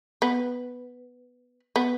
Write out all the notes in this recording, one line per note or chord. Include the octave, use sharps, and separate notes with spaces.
B3
B3